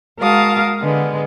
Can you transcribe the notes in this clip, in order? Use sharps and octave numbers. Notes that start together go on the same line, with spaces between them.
G#3 F#4 A#4 F5 A5 D#6
D3 G#3 B3